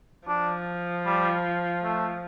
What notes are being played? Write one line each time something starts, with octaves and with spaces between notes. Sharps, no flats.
F3 D4
G3
A3